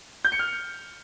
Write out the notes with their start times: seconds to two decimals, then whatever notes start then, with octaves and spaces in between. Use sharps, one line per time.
0.25 G6
0.32 C#7
0.39 F6